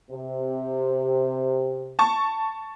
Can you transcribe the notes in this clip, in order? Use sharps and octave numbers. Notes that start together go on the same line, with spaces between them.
C3
A5 C#6